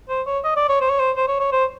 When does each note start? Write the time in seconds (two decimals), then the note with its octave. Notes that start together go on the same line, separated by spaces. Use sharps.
0.09 C5
0.26 C#5
0.44 D#5
0.56 D5
0.69 C#5
0.81 C5
0.89 C#5
1.00 C5
1.16 C5
1.28 C#5
1.40 C#5
1.52 C5